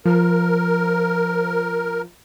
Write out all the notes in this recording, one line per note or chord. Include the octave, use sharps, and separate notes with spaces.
F3 A#4